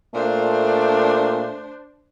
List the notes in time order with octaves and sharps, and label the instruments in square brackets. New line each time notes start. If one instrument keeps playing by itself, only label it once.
[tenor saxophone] A#2 [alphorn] A3 [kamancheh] D4 C5